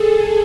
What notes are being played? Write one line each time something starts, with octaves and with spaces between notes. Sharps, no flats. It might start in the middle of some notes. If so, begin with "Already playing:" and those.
Already playing: G#4 A4